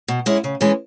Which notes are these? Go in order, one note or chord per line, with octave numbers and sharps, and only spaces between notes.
B2
G#3 C#4 E4
C#3
E3 G#3 C#4